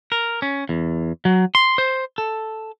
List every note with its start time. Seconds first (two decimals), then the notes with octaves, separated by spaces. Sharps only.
0.12 A#4
0.42 C#4
0.69 E2
1.25 F#3
1.55 C6
1.78 C5
2.18 A4